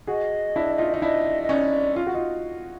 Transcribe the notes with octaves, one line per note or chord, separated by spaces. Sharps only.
F#4 G#4 D#5
D4 E4
D#4 F4
D#4
D4 E4 D#5
D#5
C#4 D#4 D5
F4
F#4
D#4 F4